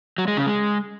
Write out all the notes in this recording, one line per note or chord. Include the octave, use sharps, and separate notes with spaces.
F#3
G#3
C#3
G#3